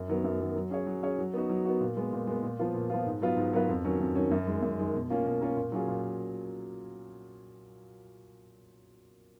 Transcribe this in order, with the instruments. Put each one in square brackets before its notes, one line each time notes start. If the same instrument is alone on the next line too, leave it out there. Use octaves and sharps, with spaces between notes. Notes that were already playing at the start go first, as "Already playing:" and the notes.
Already playing: [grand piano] F#2
D#3 F#3 B3
F#2
D#3 F#3 B3
F#3
C#4 G#4 C#5
F#3
C#4 G#4 C#5
F#3
B3 D#4 F#4
F#3
B3 D#4 F#4
A#2
G#3 B3
A#2
G#3 B3
A#2
F3 B3 F4
A#2
F3 B3 F4
G#2
F#3 B3 F4 B4
G#2
F#3 B3 F4 B4
F2
D#3 F#3 C#4
F2
D#3 F#3 C#4
F#2
D#3 G#3
F#2
D#3 G#3
B2
A#3 C#4 F4 A#4
B2
A#3 C#4 F4 A#4
A#2
F#3 C#4 F4 G#4
A#2